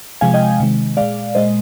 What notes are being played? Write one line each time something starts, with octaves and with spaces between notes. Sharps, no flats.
C3 F3 G#3 F5 G#5
D#5 G5
C3 D#3 G#3
A#2 G#3 D5 F5
A#2 G#3 C5 D#5